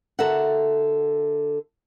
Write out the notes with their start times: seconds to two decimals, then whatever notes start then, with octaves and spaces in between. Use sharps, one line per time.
0.19 D3 F#4 A4 A#4 E5 F#5